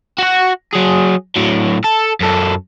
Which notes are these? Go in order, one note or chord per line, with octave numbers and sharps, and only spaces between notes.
F#4 F#5
F#3 G#4
A2 F#3
A4
F#2 A4